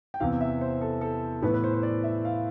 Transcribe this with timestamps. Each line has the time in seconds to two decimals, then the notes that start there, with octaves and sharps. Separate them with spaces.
0.14 G5
0.20 E2 C3 E3 F5
0.41 E5
0.61 C5
0.81 A4
1.01 A4
1.42 A2 E3 B3 B4
1.54 B4
1.64 C5
1.74 C5
1.83 D5
2.03 E5
2.25 F5